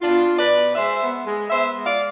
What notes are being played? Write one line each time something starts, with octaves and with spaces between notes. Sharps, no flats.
B2 D4 F4
B2
B4 D5
B2
G#3 C5 E5
B3
G#3
B3 C5 E5
G#3
D5 F5